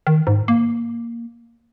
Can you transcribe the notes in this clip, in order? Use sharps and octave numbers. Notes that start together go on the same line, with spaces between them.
D#3
G#2
A#3